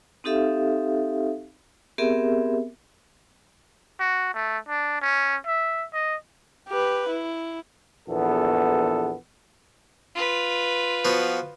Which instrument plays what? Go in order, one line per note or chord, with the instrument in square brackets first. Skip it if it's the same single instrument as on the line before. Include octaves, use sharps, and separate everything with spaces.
[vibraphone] C4 D#4 G4 A4 E5 F5
B3 C4 G4 G#4 A#4 E5
[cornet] F#4
A3
D4
C#4
E5
D#5
[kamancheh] G4 B4
E4
[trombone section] A#1 E2 B3 A4
[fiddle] F4 B4
[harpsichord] F3 B3 F#4